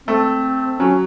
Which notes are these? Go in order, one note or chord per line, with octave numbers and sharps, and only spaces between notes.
A3 C4
F#3 C#4